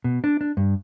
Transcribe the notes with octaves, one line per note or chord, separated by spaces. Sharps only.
B2
D4
D4
G2